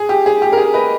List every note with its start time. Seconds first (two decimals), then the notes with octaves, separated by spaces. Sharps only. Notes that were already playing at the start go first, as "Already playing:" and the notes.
Already playing: G#4
0.09 G4
0.26 G#4
0.42 G4
0.52 A#4
0.58 G#4
0.74 B4 D#5